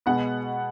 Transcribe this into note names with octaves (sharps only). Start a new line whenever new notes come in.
B2 G#3 B3 F#5